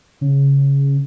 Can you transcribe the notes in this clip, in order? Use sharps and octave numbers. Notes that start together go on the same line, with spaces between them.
C#3